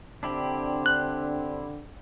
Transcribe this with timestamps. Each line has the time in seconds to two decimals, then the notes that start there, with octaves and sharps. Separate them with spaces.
0.23 D3 C4 D4 E4 G4
0.86 F#6